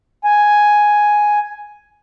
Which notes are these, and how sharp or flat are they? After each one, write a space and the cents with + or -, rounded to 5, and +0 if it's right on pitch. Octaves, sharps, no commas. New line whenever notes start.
G#5 +5